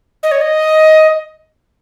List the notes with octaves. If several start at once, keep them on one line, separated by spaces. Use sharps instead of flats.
D#5
C#5
D#5